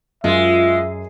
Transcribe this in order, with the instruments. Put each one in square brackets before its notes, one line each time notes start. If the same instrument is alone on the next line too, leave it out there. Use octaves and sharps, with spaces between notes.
[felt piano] F#2 [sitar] G#3 [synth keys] F4 [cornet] E5